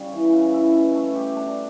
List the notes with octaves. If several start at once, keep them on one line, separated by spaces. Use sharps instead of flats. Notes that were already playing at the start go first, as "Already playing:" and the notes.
Already playing: C#3 G3 C#4
E3
C#3
E4
B2
A3
G4
D4